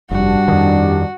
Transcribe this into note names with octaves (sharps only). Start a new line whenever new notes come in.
F1 G2 G3 D4 F#4
F2 D#3